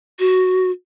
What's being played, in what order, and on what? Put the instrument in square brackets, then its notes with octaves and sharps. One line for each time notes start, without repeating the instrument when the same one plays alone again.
[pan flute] F#4